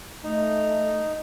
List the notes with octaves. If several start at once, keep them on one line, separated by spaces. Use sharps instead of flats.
A3 D#4